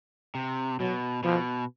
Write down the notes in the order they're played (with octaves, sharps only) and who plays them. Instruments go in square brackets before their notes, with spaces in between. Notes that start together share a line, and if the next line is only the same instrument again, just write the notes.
[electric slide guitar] C3
[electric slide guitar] B2 [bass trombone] F#3
[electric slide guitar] B2 [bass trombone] F3